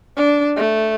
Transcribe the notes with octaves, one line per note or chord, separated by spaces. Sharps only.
D4
A3